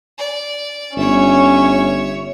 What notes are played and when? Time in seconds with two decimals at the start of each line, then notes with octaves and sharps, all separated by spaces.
0.18 D5
0.97 G1 C#4 C#5 E5